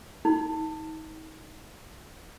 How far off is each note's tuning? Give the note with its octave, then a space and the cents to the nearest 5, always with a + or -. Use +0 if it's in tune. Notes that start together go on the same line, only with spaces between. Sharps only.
D#4 +30